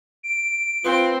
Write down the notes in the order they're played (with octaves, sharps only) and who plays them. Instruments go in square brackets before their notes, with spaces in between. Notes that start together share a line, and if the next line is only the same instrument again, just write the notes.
[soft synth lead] D7
[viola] C4 [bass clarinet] F4 [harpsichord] B4